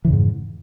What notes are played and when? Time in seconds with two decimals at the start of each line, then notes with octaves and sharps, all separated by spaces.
0.05 E3
0.07 C#3
0.10 F2
0.13 G#2